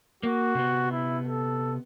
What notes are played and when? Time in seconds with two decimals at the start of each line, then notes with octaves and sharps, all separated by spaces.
0.23 A#3 F#4
0.55 C3 B3
0.92 E4
1.27 A4